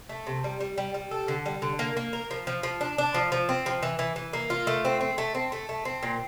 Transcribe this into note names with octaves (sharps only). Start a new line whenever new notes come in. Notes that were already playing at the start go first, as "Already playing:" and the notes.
A3
C3
G3
G3
G3
G3
A4
D3
G3
D3
A#3
A#3
A#4
F3
F3
F3
D4
D4
F3
F3
C4
F3
E3
E3
E3
A#3
F4
A3
C4
C4
A3
C4
A3
A3
C4
A#2